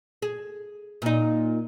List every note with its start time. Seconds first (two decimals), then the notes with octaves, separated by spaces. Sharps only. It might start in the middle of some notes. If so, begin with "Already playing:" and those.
0.22 G#4
1.02 A#2 D#4